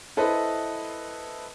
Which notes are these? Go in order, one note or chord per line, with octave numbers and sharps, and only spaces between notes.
E4 A4 B4 C5 D#5